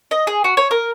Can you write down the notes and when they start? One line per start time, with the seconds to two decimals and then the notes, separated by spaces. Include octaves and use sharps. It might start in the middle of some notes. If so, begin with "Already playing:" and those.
0.11 D#5
0.27 G#4
0.44 F#4
0.57 C#5
0.71 A#4